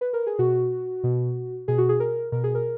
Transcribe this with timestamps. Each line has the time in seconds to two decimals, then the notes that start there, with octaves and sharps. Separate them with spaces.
0.01 B4
0.13 A#4
0.27 G#4
0.39 B2 F#4
1.04 B2
1.68 B2 G#4
1.78 F#4
1.89 G#4
2.00 A#4
2.32 B2 A#4
2.44 G#4
2.55 A#4